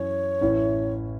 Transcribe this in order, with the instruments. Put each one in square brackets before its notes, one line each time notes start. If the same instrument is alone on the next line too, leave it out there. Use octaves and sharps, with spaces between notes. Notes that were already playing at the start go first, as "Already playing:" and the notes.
Already playing: [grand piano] F#2 E3 C#4 [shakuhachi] C#5
[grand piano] A1 A2 E3 C#4 E4